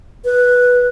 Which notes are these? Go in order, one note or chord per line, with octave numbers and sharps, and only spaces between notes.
B4